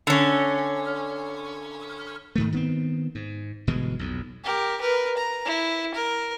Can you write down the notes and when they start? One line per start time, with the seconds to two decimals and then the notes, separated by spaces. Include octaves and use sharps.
0.07 D3 C#4
2.36 G#2 D#3 A3
2.52 D#3 B3 C4
3.15 G#2
3.67 G1 B2 E3 G#3
3.99 B1 F2
4.44 G4 A#4
4.81 A#4 B4
5.17 A#5
5.45 E4
5.95 A#4